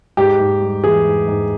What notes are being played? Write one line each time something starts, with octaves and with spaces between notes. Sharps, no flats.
G#2 G4
G#2
G3
E3 G#4
G#2
G#2